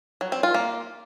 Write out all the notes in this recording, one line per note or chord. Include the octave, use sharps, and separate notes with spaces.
F#3
C4
F4
A#3